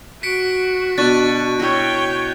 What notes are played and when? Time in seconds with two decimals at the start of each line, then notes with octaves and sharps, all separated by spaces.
0.23 F#4 B6 C#7 D7
0.98 B2 D4 C#6 F#6 A6
1.60 E4 F#4 C#5 G5